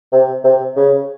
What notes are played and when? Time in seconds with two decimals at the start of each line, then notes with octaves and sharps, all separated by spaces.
0.12 C3
0.44 C3
0.76 C#3